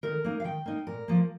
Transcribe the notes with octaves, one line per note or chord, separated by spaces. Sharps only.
D#3 A#4
A#3 D#4
F5
D#3 G5
A#3 D#4
A#2 A#4
F3 A#3